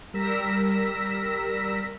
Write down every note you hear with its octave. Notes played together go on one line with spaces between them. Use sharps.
G3 A#4 E6 A#6 B6